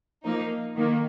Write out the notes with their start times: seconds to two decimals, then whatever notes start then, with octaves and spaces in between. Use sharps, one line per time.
0.24 F3 A#3 D#4
0.76 D#3 A#3